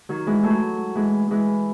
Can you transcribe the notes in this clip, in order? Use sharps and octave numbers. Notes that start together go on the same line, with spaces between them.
D#3 F#3
E3 G#3
F#3 A3
E3 G#3
E3 G#3